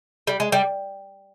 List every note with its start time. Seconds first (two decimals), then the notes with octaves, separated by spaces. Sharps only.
0.27 G3
0.40 G#3
0.52 G3